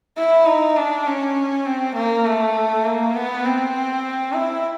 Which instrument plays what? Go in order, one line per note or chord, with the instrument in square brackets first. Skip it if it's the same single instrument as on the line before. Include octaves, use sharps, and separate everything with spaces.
[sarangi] E4
D#4
D4
C#4
C4
A#3
A3
A#3
B3
C4
E4